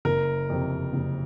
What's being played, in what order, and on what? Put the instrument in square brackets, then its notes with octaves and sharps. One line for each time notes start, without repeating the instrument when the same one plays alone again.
[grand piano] F#1 A#4
F2 C3
F#1